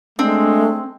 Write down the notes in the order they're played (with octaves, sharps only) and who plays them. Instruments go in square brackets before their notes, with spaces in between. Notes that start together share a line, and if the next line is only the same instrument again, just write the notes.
[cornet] G#3 [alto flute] A3 [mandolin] C4 [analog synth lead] D4